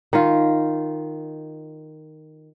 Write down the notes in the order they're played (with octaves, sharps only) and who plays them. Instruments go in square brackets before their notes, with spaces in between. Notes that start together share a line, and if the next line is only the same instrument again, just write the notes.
[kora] D#3 F4